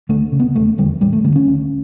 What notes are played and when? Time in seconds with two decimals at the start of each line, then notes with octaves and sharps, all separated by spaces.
0.09 D2 A3
0.32 C#3
0.40 B3
0.55 E1 A3
0.78 E2 D3 G3
1.01 A1 G3
1.13 A3
1.24 D3 B3
1.28 G2
1.36 C#4
1.47 D2